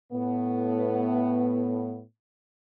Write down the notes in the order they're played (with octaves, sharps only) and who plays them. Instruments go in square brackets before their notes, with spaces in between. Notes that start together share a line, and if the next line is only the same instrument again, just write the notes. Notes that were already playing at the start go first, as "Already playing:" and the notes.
[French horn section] A2 B3